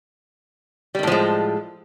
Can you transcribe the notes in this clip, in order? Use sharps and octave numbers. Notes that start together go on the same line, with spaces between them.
A2 D#3 F3 G3 G#3